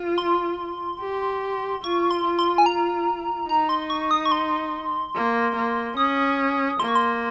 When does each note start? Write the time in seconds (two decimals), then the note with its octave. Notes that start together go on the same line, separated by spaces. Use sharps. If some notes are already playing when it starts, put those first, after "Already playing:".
Already playing: F4
0.18 C6
1.00 G4
1.83 F4 C#6
2.11 C6
2.24 F4
2.39 C6
2.58 G#5
2.66 A#5
3.48 D#4 A#5
3.69 C6
3.90 C#6
4.11 D#6
4.25 C#6
4.32 C6
5.15 A#3
5.55 A#3
5.97 C#4 D#6
6.80 A#3 C6
6.88 C#6
6.95 C6